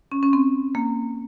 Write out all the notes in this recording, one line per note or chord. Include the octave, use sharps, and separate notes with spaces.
C#4
C#4
C4
A#3